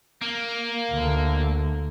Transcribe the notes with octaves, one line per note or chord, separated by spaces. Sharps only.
A#3
D2 D3